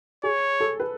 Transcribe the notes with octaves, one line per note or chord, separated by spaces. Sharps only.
G#4 C#5
A4
B4